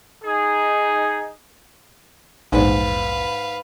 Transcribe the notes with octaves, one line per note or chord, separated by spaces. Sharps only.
D#4 G#4
A#1 E2 G#2 B4 F5